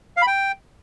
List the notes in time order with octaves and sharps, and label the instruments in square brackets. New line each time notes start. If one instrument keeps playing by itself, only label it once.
[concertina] F5
B5
G5